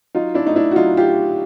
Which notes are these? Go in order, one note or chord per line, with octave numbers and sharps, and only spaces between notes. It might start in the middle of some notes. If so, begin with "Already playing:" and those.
F#3 D#4 F4
D4 E4
A2 D#4
D4 E4
F#4
F#3 D#4 F4
F4 G4